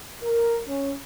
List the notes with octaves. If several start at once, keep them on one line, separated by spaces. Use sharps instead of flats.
A#4
C#4